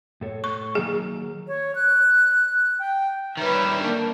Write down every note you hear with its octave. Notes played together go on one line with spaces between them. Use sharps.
A2 A4 C#5
C#6
D#3 F#3 A#3 G#4
C#5
F#6
G5
D#3 G3 B4 C#5 E5
A#3 D4